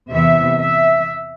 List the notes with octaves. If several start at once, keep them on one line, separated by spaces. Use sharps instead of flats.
E2 C3 E3 B3 E5
E5